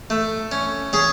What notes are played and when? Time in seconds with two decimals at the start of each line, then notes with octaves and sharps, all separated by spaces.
0.10 A3
0.52 C#4
0.93 C#4 G#4